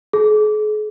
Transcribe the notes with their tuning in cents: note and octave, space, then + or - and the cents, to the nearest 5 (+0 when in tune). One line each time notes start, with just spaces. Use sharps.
G#4 +40